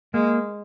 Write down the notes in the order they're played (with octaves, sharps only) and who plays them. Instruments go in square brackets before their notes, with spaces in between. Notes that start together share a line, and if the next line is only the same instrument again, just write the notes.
[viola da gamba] G#3 [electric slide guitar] A#3